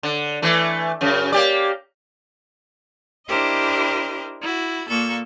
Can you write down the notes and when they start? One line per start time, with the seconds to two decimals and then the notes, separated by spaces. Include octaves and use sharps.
0.03 D3
0.42 E3 A3
1.01 F#2 C#3
1.32 A#3 G4 D5
3.27 D4 E4 G4 A#4 C5 D#5
4.41 E4 F#4
4.88 A#2 A#3 A4 C#6